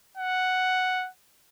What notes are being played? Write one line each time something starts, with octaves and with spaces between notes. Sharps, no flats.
F#5